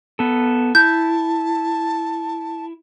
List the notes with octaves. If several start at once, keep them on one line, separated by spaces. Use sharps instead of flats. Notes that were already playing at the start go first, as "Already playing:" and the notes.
B3 A4
E4 A5 G6